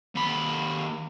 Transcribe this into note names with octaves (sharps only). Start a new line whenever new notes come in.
D#2 B5